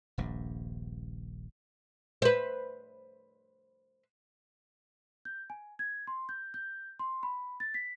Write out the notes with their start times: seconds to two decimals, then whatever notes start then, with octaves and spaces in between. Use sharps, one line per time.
0.18 D#1 A#1 G2
2.22 B4 C5
5.25 G6
5.50 G#5
5.79 G#6
6.07 C6
6.29 G6
6.54 G6
6.99 C6
7.23 B5
7.60 A6
7.74 B6